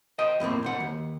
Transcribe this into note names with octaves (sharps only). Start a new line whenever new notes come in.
C5 D#5 G5
E2 A2 A#3 C4
B1 C5 F#5
D#2